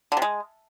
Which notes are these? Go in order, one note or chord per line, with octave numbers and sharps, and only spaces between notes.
D3
C3
G#3